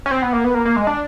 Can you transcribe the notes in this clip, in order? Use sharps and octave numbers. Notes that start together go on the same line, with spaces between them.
C#4
C4
B3
A#3
B3
A#3
A#3
G#3
D4